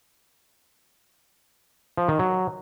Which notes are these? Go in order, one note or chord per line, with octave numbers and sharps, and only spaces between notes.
F3
D#3
F#3